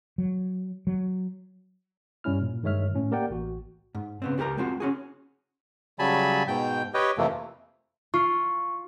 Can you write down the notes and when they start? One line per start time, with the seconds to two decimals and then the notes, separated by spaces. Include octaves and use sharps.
0.18 F#3
0.87 F#3
2.24 G2 G3 C#4 E4 F6
2.42 A#2
2.63 G2 D#3 G#3 C#5 E5 F6
2.94 A2 C#4
3.11 A#3 G4 A#4 D5 F#5 G5
3.30 A1 F#4
3.95 G#2
4.22 C#3 B3 C4
4.38 C#2 F#4 G4 A#4 A#5
4.57 G#3 C4 F4 F#4
4.80 C#4 F#4 G#4
5.99 C#3 F#3 G3 G#5 A5 B5
6.48 G#2 B2 G5 G6
6.94 G4 B4 C#5 D#5 G5
7.18 F2 C3 E3 F3 A3 A#3
8.14 F4 C#6